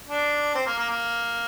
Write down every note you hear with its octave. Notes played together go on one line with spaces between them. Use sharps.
D4
C4
A#3
A#3
A#3